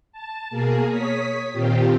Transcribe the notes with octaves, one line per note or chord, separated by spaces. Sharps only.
A5
B2 A#3 G#4 A#4
C#5 D#6 B6
A#2 D#3 C4 F4 G4